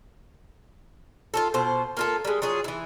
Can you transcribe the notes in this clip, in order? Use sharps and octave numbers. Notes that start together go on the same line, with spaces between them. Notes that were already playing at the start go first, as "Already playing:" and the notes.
F4 F#4 A4
B2 F4 C5
A#3 F4 A4
G3 G#3
F#3 F4 G#4
E3 E4